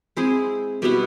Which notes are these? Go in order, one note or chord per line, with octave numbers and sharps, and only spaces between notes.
G#3 C4 E4 G#4
B2 G3 B3 E4